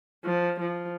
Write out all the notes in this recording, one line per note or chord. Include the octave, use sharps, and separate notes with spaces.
F3
F3